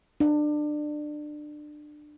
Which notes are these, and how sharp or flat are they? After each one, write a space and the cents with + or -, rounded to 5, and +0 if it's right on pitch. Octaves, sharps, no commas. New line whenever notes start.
D4 +25